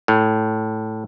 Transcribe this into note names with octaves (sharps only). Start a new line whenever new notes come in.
A2